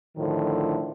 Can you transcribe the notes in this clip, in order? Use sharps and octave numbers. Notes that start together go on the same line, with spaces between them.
A2 D3 D#3 F3